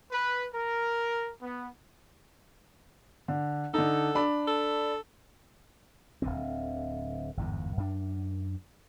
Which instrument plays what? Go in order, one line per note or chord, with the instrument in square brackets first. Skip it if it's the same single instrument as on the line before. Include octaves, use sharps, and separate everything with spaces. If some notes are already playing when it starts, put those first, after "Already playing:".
[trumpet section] B4
A#4
B3
[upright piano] D3
[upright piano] D3 D#4 [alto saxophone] A4
[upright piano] D4 B5
[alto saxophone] A4
[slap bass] D1 G#1 D3 C4
G1 E2 G#2
F#2 D4